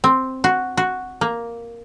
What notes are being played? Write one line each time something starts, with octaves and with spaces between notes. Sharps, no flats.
C4
F#4
F#4
A#3